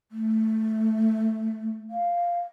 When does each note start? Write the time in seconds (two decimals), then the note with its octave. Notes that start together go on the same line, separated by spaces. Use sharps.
0.12 A3
1.90 F5